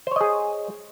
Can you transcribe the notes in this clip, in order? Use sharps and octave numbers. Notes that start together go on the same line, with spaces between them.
G#4 C5 C#5 D#5